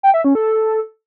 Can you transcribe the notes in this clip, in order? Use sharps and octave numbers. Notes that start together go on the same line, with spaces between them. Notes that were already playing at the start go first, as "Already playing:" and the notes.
G5
E5
C#4
A4